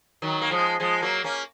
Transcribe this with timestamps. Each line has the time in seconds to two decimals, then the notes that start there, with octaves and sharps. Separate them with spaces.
0.22 D#3 F#3
0.42 A#3
0.51 F3 G#3
0.80 F3 G#3
1.02 F#3 A#3
1.24 A#3 C#4